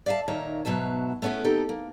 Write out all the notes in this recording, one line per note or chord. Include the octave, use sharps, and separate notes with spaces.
D5 E5 F5 G#5 A5
A#2 D#3 A#3 D#4 C#5 E5
G#2 B2 F#3 E5 A5
A3 B3 C#4 E4 G#4
D#3 C4 D#4 G4 A4
A#3